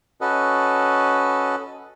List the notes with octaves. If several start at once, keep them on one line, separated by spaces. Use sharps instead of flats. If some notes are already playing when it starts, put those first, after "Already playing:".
C#4 F#4 A4 B4 D#5